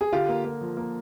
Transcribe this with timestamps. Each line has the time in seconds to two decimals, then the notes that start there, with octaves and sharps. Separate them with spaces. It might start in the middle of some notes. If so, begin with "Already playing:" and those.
0.01 G#4
0.12 D3 F4 G4
0.29 A#3
0.45 A#3
0.61 F3
0.77 A#3